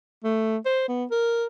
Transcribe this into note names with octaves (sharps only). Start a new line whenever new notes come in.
A3
C5
B3
A#4